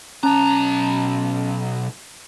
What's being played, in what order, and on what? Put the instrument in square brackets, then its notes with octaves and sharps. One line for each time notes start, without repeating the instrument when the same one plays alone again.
[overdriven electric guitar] B1 A#5 [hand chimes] C#4 A5